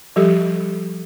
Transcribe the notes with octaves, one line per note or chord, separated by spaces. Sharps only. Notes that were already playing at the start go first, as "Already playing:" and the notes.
F3 G3 G4 A4